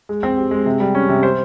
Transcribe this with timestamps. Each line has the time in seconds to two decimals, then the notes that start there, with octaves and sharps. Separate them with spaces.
0.09 G#3
0.23 C4
0.37 G4
0.51 G#3
0.66 C3
0.80 G3
0.95 C#4
1.09 C3
1.23 C5